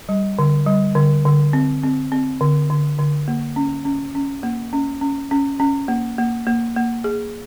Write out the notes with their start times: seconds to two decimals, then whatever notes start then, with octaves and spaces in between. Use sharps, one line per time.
0.09 G3
0.39 D3
0.66 G3
0.95 D3
1.25 D3
1.53 C4
1.83 C4
2.12 C4
2.41 D3
2.70 D3
2.99 D3
3.28 A#3
3.56 C#4
3.85 C#4
4.15 C#4
4.43 A#3
4.73 C#4
5.01 C#4
5.31 C#4
5.60 C#4
5.88 A#3
6.18 A#3
6.47 A#3
6.76 A#3
7.04 G#4